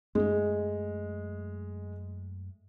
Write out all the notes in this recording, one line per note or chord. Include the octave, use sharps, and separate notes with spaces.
F#2 G#3 A3